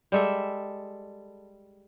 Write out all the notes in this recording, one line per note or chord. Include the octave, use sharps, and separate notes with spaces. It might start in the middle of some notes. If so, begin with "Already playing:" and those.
G3 G#3 A4 E5